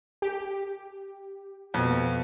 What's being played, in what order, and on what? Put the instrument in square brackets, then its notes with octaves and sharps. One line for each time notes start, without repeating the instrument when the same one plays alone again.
[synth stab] G4
[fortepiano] F2 [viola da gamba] B2